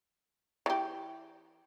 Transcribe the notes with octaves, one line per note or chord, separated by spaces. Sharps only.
E3 G4